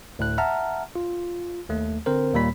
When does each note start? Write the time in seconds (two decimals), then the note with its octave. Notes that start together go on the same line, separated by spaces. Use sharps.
0.19 D2 A2 F#6
0.38 E5 F#5 A5 A#5 F6
0.96 F4
1.69 D#2 A3
2.06 D3 C4 A#4 C5
2.34 D#2 A#2 G3 A#3 B5 B6